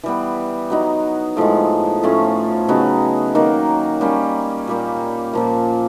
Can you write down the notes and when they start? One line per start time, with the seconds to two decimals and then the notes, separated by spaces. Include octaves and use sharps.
0.04 E3 G3 B3
0.70 F#3 B3 D#4
1.37 A2 F3 G#3
2.03 A2 F3 A3 C#4
2.69 C#3 F#3 B3 D#4
3.35 D#3 F#3 A#3
4.01 G3 A#3 C#4
4.68 A#2 G3 A#3
5.33 A#2 F3 A#3